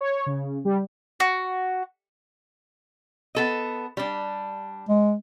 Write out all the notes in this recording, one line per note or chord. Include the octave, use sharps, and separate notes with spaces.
C#5
C#3
G3
F#4
B3 A4 D#5
G3 D4
G#3